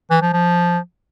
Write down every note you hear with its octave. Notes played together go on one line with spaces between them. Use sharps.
E3
F3
F3